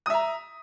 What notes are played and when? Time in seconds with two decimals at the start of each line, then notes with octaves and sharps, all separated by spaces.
0.06 D#6
0.10 E5
0.14 A#5